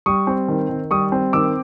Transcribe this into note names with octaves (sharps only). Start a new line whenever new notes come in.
G3 C#6 D#6
C4
D#3
D#3
G3 C#6 D#6
C4
D#3 D6 E6